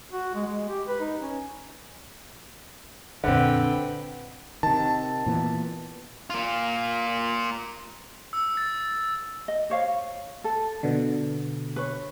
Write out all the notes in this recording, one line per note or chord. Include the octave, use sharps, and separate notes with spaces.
F#4
G#3
G#3
G4
B4
D#4
C#4
A#1 F2 D3 C4 B4 G5
C3 D#3 A5
A#2 E3 B3
A#3 F4
E6
A6
D#5
C5 C#5 F5
A4
B2 D3
B4 C#5